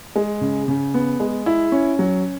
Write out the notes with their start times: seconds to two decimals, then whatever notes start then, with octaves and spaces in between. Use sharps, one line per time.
0.16 G#3
0.41 C#3
0.68 C#3
0.94 B3
1.20 G#3
1.46 E4
1.72 C#4
1.99 F#3